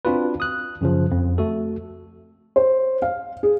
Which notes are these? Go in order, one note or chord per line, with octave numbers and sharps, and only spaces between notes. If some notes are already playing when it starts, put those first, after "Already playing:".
C4 D4 F4 F#4 B4
D#6 F#6
F#2 C#3 F3
F2
A3 F#4 A4
C5
F5
G#4